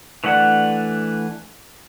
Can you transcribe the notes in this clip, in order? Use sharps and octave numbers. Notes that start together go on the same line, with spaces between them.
E3 A3 D4 F#5